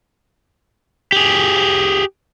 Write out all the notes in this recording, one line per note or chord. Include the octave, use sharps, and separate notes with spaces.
G4 G#4